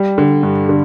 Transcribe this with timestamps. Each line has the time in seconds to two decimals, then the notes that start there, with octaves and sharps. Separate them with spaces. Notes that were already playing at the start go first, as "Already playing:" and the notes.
Already playing: G3
0.18 D3
0.43 G2
0.69 D3